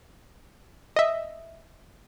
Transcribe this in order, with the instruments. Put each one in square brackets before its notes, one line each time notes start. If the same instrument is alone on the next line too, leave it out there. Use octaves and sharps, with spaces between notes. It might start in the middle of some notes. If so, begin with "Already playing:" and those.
[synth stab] D#5 E5